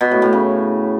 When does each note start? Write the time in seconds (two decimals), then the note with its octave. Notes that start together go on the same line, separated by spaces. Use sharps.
0.01 B2
0.11 A2
0.22 A2
0.33 C#3